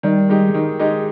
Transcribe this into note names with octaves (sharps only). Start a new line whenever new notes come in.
D#3 G3
G#3 D#4 G4
D#3
G#3 D#4 G4